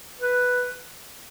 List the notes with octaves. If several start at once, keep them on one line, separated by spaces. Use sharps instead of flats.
B4